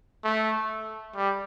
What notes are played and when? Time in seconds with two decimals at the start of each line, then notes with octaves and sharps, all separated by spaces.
0.25 A3
1.16 G3